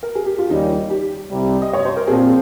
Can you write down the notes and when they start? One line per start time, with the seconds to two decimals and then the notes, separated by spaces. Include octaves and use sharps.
0.03 A#4
0.15 G#4
0.26 G4
0.38 F4
0.50 D#2 C#3 G3 D#4
0.90 G4
1.30 C2 C3 G3
1.62 D#5
1.73 C#5
1.85 C5
1.96 A#4
2.07 A#2 F3 C4 G#4